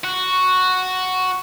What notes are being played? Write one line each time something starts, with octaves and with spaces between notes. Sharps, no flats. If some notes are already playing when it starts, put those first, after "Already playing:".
F#4